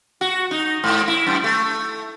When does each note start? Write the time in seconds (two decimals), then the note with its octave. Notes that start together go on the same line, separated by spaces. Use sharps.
0.21 F#4
0.51 D#4
0.84 G#2
1.08 E4
1.27 F#2
1.44 A3